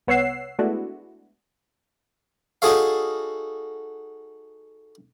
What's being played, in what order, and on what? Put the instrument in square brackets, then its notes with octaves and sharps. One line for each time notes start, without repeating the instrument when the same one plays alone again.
[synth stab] C2 B3 C#5 F#5 E6 C7
G#3 A3 B3 D4 E4 F#4
[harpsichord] D#4 F#4 G#4 A4 C#5 F5